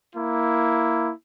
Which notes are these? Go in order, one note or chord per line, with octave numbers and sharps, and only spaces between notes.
A#3 E4